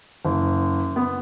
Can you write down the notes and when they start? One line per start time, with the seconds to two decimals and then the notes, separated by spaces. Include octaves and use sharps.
0.25 F#1
0.96 B3